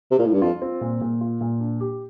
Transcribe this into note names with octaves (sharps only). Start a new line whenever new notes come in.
C3
A#2
A2
G2
F2 F4
C4
A#2
A#2
F4
A#2
D4
G4